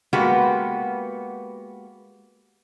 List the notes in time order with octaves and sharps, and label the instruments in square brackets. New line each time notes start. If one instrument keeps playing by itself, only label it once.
[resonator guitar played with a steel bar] G#3 A#3 B3 F#4 G4 B4